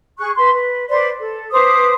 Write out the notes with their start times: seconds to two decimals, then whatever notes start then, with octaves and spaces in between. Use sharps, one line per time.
0.18 G#4 C#6 F#6
0.36 B4 C6
0.51 B4
0.88 B4 C5 D5 C6
1.18 A4
1.51 B4 C5 D6 D#6